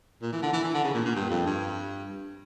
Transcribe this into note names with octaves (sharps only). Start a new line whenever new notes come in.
A#2
E3
D3
E3
E3
D3
C#3
A#2
A#2
G2
F2
G2